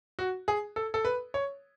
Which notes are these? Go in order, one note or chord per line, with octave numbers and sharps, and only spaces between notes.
F#4
G#4
A4
A4
B4
C#5